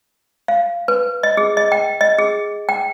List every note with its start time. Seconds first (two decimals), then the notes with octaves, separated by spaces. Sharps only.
0.48 F5
0.88 B4
1.23 D#5
1.37 G#4
1.57 D#5
1.72 G5
2.01 D#5
2.19 G#4
2.69 G5